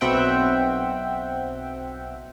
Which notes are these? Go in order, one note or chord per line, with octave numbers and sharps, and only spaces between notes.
B1 B2 C4 E5 F#5 G5